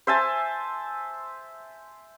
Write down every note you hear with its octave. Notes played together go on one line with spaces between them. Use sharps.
C5 E5 G#5 A5